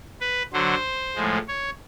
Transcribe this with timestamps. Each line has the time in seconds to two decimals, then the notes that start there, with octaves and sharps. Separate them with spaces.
0.21 B4
0.53 D3 F#3 C5
1.16 A2 F3 G#3
1.48 C#5